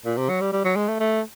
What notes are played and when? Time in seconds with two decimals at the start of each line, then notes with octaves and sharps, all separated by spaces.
0.05 A#2
0.17 C3
0.29 F#3
0.41 G3
0.52 G3
0.64 F#3
0.76 G#3
0.88 A3
1.00 A3